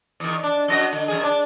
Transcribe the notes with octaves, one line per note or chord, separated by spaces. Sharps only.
E2 D#3
D4
F#2 F#4 D#5
D3
F#2 D#3 G#4
D4